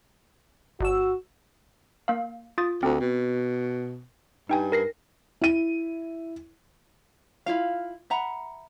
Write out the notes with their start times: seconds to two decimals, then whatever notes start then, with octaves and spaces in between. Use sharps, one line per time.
0.80 G1 F#4 E6
2.08 A#3 F5
2.58 F4 D#6 A6
2.83 D2 C4
3.00 B2
4.49 G2 D#4 G5 G#5
4.72 A#4 A#6 C7
5.41 E4 D#7
7.46 E4 F4 F5
8.10 E5 F#5 A#5 B5